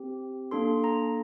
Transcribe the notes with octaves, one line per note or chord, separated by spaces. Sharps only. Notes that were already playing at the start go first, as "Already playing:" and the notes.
Already playing: C4 G4
A#3 D4 A4 C6
A#5